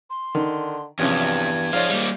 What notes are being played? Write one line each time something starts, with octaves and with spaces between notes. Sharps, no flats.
C6
D3 D#3
E2 G2 C3 F3 C#4 G#6
F2 G#2 F4 C#5 D5 F5
G3 A#3